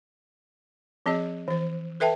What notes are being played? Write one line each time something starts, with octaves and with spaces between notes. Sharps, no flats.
F3 C4 G#4 D#5
E3 C5
A4 B4 E5 G5 A5